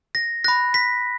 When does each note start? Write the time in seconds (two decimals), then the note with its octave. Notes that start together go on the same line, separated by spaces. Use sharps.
0.15 A#6
0.44 B5 F#6 A#6
0.74 B6